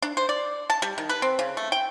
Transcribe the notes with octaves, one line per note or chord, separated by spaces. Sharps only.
D4
C5
D5
A5
G3
D#3
B4
C4
C#3
A3
G5